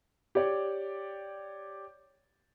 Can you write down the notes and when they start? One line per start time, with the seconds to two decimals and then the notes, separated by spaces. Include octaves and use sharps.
0.35 G4 C#5 D5